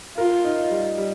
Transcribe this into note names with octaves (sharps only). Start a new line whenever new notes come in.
F4 A#4
D#4
G3
G3